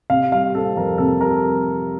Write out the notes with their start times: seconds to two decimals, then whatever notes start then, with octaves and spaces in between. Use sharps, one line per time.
0.10 C3 F5
0.32 G3 F5
0.55 C4 A4
0.76 F2 A#4
0.98 C3 A4
1.21 G3 A#4